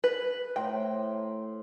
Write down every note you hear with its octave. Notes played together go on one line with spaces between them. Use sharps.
B4
A2 C5 G5 A#5